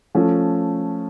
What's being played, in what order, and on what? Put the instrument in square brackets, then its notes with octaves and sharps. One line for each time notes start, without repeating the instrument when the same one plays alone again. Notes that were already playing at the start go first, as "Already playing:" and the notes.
[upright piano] F3 A3 C#4